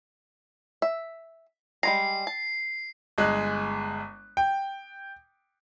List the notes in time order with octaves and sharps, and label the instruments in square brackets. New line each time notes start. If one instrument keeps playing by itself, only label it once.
[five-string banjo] E5
[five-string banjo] G3 G#3 A#5 [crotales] C7
[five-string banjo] A5
[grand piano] G1 G#3 F#6
G5